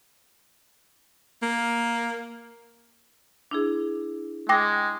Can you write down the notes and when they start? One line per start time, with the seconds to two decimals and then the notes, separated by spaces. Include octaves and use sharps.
1.43 A#3
3.51 D4 E4 G#4
4.49 G#3 G5 D6 A#6